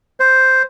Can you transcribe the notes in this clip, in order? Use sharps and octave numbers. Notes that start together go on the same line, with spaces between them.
C5